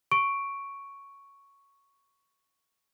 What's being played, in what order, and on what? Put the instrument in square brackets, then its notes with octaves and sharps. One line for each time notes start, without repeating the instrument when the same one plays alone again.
[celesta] C#6 D7